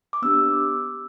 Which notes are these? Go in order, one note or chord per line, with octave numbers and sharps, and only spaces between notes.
D6
B3 D4 G4 E6